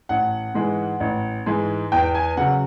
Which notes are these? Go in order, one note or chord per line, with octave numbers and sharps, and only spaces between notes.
A1 F#5
G#2 E3 G#3
A1
G#2 E3 G#3
E2 G5
G#5
C#3 F#3 F#5